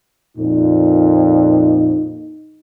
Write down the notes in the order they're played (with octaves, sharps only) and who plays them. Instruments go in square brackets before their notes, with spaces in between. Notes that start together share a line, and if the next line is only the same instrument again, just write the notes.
[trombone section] F2 A#2 [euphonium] D#4